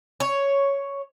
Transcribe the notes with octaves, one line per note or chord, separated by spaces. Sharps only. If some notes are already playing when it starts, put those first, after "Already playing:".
C#5